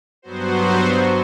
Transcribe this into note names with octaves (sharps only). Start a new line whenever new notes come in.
G2 F#3 B3 F#4 C5